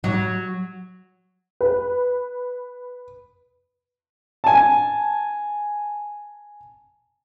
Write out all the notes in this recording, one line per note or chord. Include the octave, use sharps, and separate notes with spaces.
F#3
B4
G#5 A5